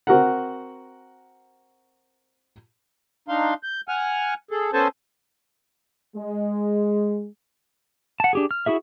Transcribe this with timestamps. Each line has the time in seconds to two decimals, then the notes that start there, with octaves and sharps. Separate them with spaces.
0.07 C4 F#4 A#4 F#5
3.28 D4 D#4 F5 C6
3.63 G6
3.88 F#5 G#5 F6
4.51 G#4 A4
4.73 B3 C#4 A4 C5 G#5 A5
6.16 G#3
8.20 F#5 A5
8.33 D4 G4 G#4
8.51 F6
8.66 E4 F#4 G#4 E5